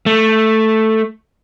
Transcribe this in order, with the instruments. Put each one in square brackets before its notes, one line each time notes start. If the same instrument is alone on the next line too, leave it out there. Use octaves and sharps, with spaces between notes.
[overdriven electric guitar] A3